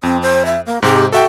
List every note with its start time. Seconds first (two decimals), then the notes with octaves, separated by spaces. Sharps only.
0.03 F2 C4
0.22 C5
0.45 E5
0.66 A#3
0.82 G#2 C3 G#3 G4
1.12 F#4 A4 E5 G5